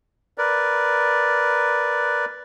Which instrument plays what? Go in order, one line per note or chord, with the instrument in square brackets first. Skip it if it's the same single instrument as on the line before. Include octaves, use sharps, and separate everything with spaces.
[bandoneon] A#4 B4 D5